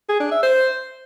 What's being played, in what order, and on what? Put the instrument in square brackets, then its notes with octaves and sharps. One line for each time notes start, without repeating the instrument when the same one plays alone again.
[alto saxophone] G#4
D4
E5
C5